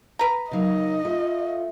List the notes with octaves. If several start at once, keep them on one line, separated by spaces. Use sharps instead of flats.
B4 A#5
C#3 F#3 A#3 D#4 D#5
A3 F4